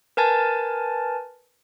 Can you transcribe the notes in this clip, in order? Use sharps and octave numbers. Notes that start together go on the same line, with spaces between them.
A#4 B4 G#5 A5 A6